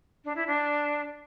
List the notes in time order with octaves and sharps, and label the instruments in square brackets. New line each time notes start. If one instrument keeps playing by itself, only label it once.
[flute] D4
E4
D4